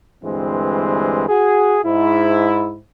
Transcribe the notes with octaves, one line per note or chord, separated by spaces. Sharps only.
D2 G2 E3 G#3 C4
F#4 G#4
G#2 E4